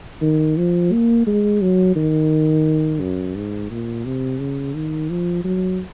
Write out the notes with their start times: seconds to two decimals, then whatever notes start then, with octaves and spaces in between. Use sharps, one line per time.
0.22 D#3
0.57 F3
0.92 A#3
1.27 G#3
1.62 F#3
1.96 D#3
3.01 F#2
3.36 G#2
3.71 A#2
4.05 C3
4.40 C#3
4.75 D#3
5.10 F3
5.44 F#3